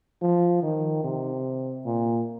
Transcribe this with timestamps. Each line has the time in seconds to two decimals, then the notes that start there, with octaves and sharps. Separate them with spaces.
0.22 F3
0.62 D#3
1.04 C3
1.86 A#2